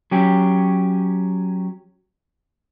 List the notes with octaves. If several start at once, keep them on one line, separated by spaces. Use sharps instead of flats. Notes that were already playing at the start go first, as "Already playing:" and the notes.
F#3 C#4 G4